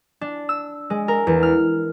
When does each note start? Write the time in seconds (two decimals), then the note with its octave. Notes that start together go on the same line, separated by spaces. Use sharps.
0.21 D4
0.49 E6
0.90 G#3
1.08 A#4
1.27 E2
1.43 F6